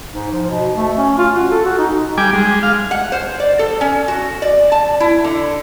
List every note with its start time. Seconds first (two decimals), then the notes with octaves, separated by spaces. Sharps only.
0.12 G#2
0.32 F3
0.50 B2
0.76 A3
0.98 C#4
1.18 F4
1.35 F#4
1.51 A4
1.66 F#4
1.78 D#4
2.18 G3 G#5 D6
2.33 G#3
2.63 F5
2.91 F#5
3.12 C5
3.40 D5
3.59 A4
3.81 C#4
4.08 F#4
4.42 D5
4.72 A5
5.00 E4
5.24 D3